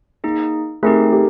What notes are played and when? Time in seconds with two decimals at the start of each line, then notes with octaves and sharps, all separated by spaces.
0.24 A#3 D#4 G#4
0.83 A3 C4 D#4 G4 G#4 A#4
1.12 G4 A4